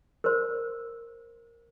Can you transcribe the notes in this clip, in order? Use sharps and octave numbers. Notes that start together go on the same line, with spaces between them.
A#4 C5